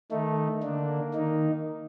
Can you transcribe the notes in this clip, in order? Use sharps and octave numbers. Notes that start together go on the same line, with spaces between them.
D#3 A3 D#4
D3 A#3 D4
D#3 D#4